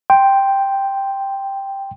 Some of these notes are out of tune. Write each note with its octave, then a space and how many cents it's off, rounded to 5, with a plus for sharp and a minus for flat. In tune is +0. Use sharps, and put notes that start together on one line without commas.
G5 +0 C6 +0